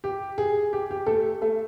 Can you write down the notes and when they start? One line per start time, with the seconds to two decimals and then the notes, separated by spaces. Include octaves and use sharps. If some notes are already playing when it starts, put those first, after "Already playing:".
0.04 G4
0.38 G#4
0.73 G4
0.91 G4
1.06 A3 A4
1.41 A3 A4